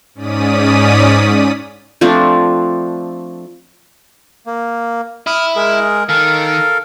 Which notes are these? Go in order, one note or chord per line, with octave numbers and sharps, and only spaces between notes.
G#2 C#4 D5 D#6 B6 D#7
F3 A3 C4 D4
A#3
E4 D#6 F6
G#3 G#4 A#4
D#3 A4 A#4 F5